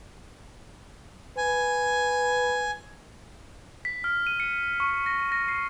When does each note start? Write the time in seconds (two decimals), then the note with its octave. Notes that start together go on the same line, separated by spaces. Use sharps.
1.37 B4 G#5
3.85 B6
4.04 F6
4.27 D#7
4.40 C#7
4.80 C#6
5.06 A#6
5.32 A#6
5.49 C7